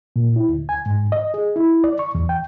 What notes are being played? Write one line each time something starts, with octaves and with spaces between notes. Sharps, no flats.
A#2
E4
D2
G#5
G#2
D#5
G#4
E4
D5
C#6
E2
G5